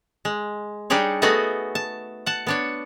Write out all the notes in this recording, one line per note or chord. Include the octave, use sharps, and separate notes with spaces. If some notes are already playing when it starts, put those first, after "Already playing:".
G#3
G3 D4 D#4 G4 G#4 C#5
A3 B3 F#4 G#4 D#5
A5
F#5 A5
B3 D4 C#5